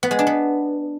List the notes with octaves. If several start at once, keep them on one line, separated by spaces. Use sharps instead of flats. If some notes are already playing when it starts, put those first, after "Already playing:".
B3
G#3
D4
B3